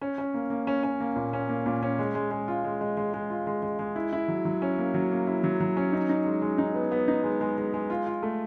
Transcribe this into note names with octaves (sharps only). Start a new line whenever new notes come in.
C#4
C#4
A#3
A#3
C#4
C#4
A#3
A#2
C#4
A#3
A#2
C#4
G#3
G#3
G#3
F4
G#3
G#3
G#3
G#3
F4
G#3
G#3
G#3
E4
E4
F#3
F#3
C#4
A#3
F#3
A#3
E4
F#3
F#3
C#4
D#4
D#4
G#3
G#3
D#4
B3
B3
D#4
G#3
G#3
G#3
G#3
F4
F4
A3